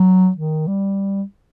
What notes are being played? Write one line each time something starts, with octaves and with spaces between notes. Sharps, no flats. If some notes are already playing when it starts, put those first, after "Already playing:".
Already playing: F#3
D#3
G3